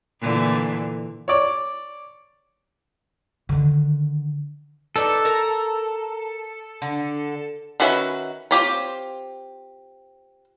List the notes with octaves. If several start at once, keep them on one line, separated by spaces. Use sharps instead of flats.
A#2 D3 E3
C#5 D5
D3 D#3
D#4 A4 B4 D5
A#4 A#5
D3
D#3 C#4 F#4 B4 E5
C4 F4 G4 C5 C#5